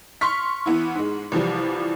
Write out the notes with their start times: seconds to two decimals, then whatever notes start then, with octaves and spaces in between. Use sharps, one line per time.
0.21 C6 C#6 F6 B6
0.66 E3 B3 E4
0.95 G#2 G#3
1.32 C2 E3 F3 G3